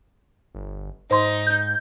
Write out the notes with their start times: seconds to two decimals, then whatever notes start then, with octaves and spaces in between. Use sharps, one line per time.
0.55 G1
1.11 G#2 D#4 C5 C6
1.47 G6